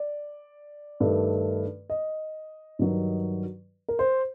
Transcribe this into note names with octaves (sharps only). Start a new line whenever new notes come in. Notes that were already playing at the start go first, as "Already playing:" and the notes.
Already playing: D5
G2 D#3 A3
D#5
G2 D#3 F#3
A#4
C5